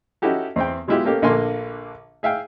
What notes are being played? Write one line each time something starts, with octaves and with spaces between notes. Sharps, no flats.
C#4 D#4 E4 F#4 G4 A4
E2 C4 G5
F#3 G#3 B3 E4 F4 G4
A3 A#3 C#4 G4
A#1 D3 A3 A#3 G#5 C6
G#4 E5 F5 G5